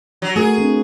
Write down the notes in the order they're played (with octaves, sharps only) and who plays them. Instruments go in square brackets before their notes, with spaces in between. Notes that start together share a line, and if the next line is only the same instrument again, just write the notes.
[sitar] F#3
[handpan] A3 F#4 A#4 [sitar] G#4
[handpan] C4 D4